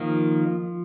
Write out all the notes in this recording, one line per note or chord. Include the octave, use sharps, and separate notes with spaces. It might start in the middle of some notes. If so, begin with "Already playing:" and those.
Already playing: D#3 F3 A#3 F4